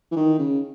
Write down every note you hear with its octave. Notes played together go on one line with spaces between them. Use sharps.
E3
D#3
C#3